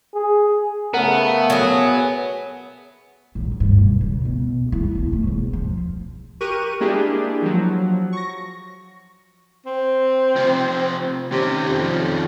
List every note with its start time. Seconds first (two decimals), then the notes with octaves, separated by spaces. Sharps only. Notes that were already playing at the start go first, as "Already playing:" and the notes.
0.14 G#4
0.94 C#3 A3 B3 A#4 F#5
1.50 F#3 G#4
3.35 A#1
3.60 G2
3.78 B1
4.01 C#3
4.25 B2
4.72 E4
4.95 B1
5.13 A3
5.27 E1
5.53 F3
6.41 G4 A#4 C#6 F#6 D#7
6.80 G#3 A#3 D4 E4 G4 G#4
7.42 F3 F#3
8.13 C#6 A#6
9.66 C4
10.36 C3 F3
11.32 C3 D#3 C#4
11.69 F2